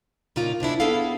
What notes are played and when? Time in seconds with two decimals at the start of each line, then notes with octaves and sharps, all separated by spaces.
0.36 A#2 C#3 A#3 D#4 F4
0.60 C3 G#3 D4 E4
0.80 B3 D4 E4 G#4 A4 F5